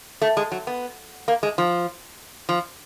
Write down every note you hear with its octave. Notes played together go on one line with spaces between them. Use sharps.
A3
G#3
F#3
B3
A#3
G#3
F3
F3